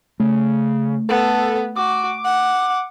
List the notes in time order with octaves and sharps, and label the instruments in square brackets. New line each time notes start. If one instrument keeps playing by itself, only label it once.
[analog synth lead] C#3 [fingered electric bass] A3
[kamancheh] B3 [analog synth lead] A4
[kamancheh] F#4 [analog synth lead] D6
[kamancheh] F#5